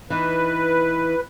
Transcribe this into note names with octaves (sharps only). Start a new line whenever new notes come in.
E3 D#4 B4